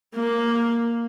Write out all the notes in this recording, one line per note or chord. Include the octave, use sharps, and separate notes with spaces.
A#3